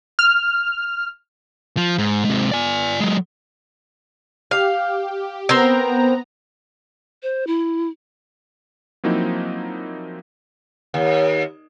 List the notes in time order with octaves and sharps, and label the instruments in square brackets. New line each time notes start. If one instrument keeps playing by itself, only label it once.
[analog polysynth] F6
[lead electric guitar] F3
G#2
G#2 C3
D5 G#5
F#3 G#3
[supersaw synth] G4 [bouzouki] F5
[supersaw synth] B3 A#5 [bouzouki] C4 A#4 C5
[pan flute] C5
E4
[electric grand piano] F3 F#3 A#3 C4 D#4 E4
[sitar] D#2